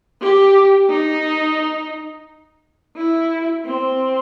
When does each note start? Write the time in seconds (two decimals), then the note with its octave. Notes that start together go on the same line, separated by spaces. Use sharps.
0.21 G4
0.90 D#4
2.97 E4
3.66 C4